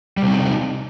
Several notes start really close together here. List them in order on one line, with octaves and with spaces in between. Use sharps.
G3 C3 C4 D#4